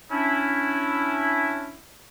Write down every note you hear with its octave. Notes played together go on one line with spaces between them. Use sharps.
C#4 D4 E4